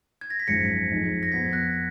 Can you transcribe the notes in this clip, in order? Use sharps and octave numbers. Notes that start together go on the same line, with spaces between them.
G#6
A#6
B6
G#1 F#2 F3 G#3 A#6 C#7
F2 F3 G#3 D#4
A#6
F2 F3 B3 G#6 B6
F#6 A#6